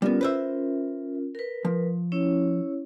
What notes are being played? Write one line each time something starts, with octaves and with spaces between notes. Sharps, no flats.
G3 B3 C#4 F4 A#4
B4 C5 E5
A#4 B4
F3
C#4 E4 C#5